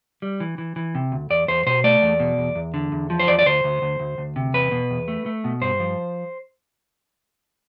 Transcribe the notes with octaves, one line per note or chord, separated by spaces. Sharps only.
G3
E3
E3
E3
C3
D2
E2 D5
E2 C5
B2 C5
A3 D5
E2
B2
E2
E2
D3
E2
F3
C5
E2 D5
D5
D2 C5
D2
D2
D2
D2
C3
E2 B4
B2
E2
A3
A3
B2
G2 C5
F3